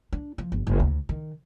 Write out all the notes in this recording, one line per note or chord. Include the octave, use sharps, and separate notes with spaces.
D4
F3
G1
F#1
D2
D#3